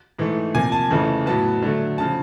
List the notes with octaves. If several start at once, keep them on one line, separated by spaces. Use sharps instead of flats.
G#2 E3 A3
C3 F3 A#3 G#5
A5
F2 C#3 E3 A3
A2 F#3 B3 A5
D3 F#3 A3
C#3 F3 A5